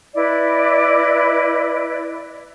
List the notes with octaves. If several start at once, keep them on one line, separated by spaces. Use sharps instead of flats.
E4 B4 D5 D#5